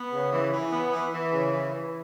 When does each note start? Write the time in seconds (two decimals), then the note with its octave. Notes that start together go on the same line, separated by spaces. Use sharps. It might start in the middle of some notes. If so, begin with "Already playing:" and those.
Already playing: B3
0.12 C#3
0.33 E3
0.53 E3
0.73 B3
0.93 E3
1.13 E3
1.33 C#3
1.53 E3
1.73 E3